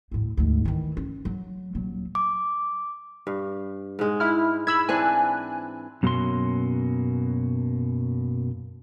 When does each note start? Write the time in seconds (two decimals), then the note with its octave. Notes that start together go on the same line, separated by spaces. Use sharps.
0.11 D2 A2
0.37 D2 G#2
0.65 D#3 E3
0.97 C#4
1.25 F#3
1.75 D#1 F#3
2.15 D6
3.27 G2
3.99 G#2 G#3
4.20 E4 F6
4.67 E4 B5 E6 G#6
4.89 E3 C4 D4 G#5 F#6
6.03 F#2 B2 F#3 A#3 C#4 C6